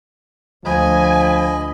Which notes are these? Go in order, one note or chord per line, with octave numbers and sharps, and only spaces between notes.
D2 F3 D#5 G#5 B5